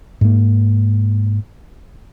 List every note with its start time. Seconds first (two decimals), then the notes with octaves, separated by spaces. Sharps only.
0.21 G#2 A#3